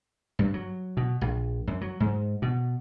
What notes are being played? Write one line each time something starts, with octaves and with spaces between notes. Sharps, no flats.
G2
F#3
B2
A#1
F#2
F#3
G#2
B2